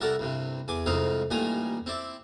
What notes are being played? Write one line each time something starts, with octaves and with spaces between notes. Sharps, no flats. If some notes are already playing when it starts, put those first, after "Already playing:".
C2 F#4 A4 A#4 D5
C2 G2 C3
E2 G#5 D6
C2 F2 G#2 C4 D#4 F5
A1 A#2 D#3 G3 G#5 A#5
C4 E4 D5